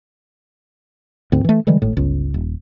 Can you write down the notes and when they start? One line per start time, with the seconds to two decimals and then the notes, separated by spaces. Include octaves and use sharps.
1.32 D2 G#2 C4
1.45 E3 A3
1.67 D3 E3 G3 G#3
1.82 G#1 A2
1.97 G1 C#2
2.34 D#1